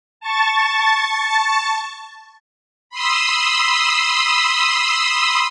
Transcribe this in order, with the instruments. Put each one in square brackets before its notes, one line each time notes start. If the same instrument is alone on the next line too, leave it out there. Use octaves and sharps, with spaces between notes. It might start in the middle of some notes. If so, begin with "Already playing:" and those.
[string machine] A5 C#6 A6
B5 C6 D#6 E6